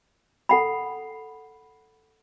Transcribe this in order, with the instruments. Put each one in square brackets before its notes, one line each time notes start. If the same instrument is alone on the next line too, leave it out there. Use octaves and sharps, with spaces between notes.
[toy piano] A4 F#5 B5